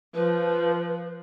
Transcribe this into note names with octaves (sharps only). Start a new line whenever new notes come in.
F3 B4